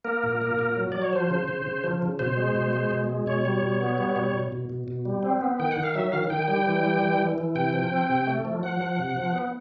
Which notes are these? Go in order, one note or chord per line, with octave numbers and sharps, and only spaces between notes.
A#3 A#4
A#2
A#3
A#2
F#3
F#3 D5
C#5
F3 C5
C#3
C#3
C#3
F3
C#3
B2 C5
G#3
B2
G#3
B2
G#3
B2 C#5
G3
B2
B3
G3
B2
B2
B2
B2
B2
G3
C4
B3
D#3 G5
F#5
D#3
F5
F#3 E5
D#3 F5
D#3 G5
G3 G5
E3
G3
E3
E3
E3
C3 G5
F3
C4
C3
A3
F3
F3 F#5
F3
C3
F3
B3